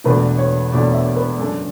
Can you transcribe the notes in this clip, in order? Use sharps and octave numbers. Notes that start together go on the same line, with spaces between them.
E1 E2 B2 A3 D4 B4
C#5
E1 E2 B2 A3 D4 D5
E5
B4
F#2 C#3 G#3 D4 A4